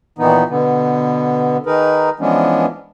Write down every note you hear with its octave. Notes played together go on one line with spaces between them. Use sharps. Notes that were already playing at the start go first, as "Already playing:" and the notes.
A#2 D#3 E3 B3 D#4
B2 D3 B3
D#3 D#4 G#4 A#4 B4
E3 F3 G#3 B3 C#4 D4